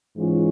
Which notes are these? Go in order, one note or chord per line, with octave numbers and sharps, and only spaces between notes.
G#2 E3 G#3 C#4 F4